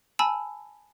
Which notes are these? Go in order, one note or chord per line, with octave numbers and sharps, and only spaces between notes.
G#5 A5 B5 E6